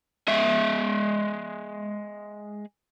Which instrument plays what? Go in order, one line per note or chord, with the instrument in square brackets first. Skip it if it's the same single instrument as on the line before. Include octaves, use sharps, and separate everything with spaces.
[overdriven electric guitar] G#3 E5